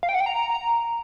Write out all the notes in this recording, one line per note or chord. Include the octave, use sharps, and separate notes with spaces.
F5
G5
F#5
G5
A#5